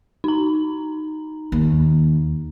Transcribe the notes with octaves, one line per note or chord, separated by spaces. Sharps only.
D#4 A#5
D#2